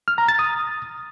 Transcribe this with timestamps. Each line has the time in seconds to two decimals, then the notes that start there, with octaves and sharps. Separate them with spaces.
0.08 F6
0.18 A#5
0.28 A6
0.39 D#6